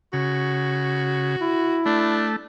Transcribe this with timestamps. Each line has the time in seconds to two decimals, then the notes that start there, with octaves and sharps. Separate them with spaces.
0.13 C#3 F#4
1.41 E4
1.86 A3 D4